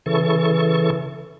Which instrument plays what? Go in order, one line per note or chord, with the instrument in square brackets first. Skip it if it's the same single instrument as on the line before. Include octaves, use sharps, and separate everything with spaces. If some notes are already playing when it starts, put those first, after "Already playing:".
[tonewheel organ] C#3 E3 A4 C#6